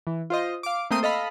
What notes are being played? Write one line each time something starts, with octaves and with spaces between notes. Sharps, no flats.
E3
F4 C5 D#5
F5 D6
A3 A#3 C4 C6 D#6 D#7
A4 D#5 F5 B5